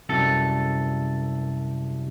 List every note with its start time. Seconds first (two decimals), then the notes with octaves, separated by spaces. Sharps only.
0.09 C2 F#2 A4